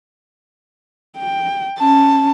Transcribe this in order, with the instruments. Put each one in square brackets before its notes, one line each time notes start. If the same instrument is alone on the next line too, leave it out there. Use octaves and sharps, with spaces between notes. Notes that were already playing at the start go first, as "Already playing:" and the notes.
[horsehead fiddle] G5
[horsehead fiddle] C#4 [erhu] A5